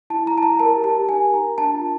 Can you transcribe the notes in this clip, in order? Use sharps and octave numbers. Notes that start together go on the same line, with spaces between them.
E4 A5
E4 A#5
A5
E4 A#5
A#4 A5
G4
A5
G4
D#4 G#5
A#4
A#5
A#4
D4 A5
F4